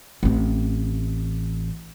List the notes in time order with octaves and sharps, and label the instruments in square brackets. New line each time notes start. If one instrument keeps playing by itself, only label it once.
[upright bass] A1 C4